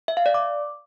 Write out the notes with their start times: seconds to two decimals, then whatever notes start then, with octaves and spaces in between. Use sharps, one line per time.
0.08 E5
0.17 F5
0.26 D5
0.34 D6